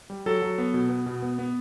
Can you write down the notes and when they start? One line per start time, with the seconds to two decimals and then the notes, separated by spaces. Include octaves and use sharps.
0.10 G3
0.26 F#3 A4
0.42 F#3
0.58 B3
0.74 B2
0.90 B3
1.06 B2
1.22 B3
1.39 B3